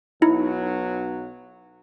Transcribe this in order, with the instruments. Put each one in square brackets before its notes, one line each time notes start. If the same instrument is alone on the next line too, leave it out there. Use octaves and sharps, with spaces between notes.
[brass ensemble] B1 F#3 [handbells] D#4 E4